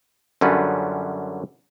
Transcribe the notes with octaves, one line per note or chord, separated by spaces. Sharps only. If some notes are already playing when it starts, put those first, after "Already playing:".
F#2 D3 G3 C#4 F4 B4